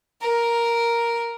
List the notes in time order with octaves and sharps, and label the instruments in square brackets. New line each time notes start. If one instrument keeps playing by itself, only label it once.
[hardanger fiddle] A#4